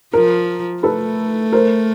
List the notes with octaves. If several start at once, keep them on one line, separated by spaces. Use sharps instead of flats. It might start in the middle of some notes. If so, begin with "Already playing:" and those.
F3 A#4
A3 A4 B4
A#4 C5